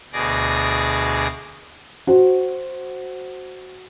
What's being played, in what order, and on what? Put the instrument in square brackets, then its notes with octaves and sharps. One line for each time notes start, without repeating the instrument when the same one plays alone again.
[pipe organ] D2 B2 G#4 D5 A#6
[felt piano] F#4 C5